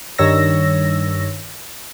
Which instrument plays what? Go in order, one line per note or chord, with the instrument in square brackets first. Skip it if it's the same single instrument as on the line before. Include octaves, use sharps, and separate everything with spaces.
[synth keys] G2 D#3 C#5 E6 A#6